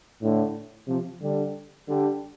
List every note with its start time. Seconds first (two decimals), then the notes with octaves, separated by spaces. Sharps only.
0.22 A2 D3
0.87 C3 F3
1.21 D3 G3
1.87 D3 G3